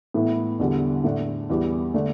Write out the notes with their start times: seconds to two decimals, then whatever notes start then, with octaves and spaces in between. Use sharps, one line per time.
0.14 A2 E3 B3 E4
0.59 E2 D3 G3
1.04 A2 A3 D4
1.50 E2 E3 G3
1.94 D3 A3 D4